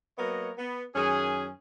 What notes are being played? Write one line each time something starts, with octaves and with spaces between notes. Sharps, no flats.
F#3 A#3 B3 A#4 C#5 D#5
B3
F#2 D#3 C#4 G#4